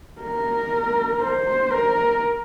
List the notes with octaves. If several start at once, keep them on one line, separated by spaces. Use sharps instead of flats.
A#4
C5
A#4